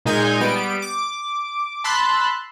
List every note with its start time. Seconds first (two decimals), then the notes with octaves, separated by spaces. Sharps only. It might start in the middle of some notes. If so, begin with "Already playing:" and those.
0.05 A#2 G#3 D#4 G#5 G6
0.40 G3 B3 D7
0.82 D6
1.84 A5 B5 C6 E6 F#6 A6